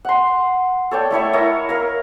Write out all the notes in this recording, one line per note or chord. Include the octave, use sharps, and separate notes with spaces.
F#5 C6
A4 C#5 D5 G5
A3 E4 C#5 E5
E4 A#4 C#5 D#5
A#4 F5